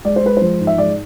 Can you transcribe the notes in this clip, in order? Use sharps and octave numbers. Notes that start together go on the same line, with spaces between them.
G#3 D5
C5
G#3 B4
F3 C5
G#2
E5
G#3 D5